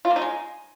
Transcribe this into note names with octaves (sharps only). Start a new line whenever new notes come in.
F4
A#3
D#4
G#3